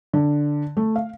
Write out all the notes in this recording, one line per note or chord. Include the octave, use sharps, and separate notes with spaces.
D3
A3
F5